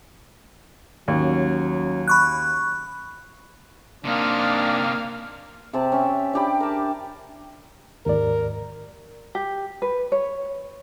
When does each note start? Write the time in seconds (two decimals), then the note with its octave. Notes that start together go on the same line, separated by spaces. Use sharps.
1.08 D#2 F#3 C#4
2.08 B5 C#6 F#6
4.05 C3 A#3 D4 D#4 F5
5.73 C3 C4 G4 A5
5.92 C#4 E5
6.33 D4 G4 B5
6.60 A#4 A5
8.06 D#2 G#2 A#4 D5
9.35 G4
9.82 B4
10.12 C#5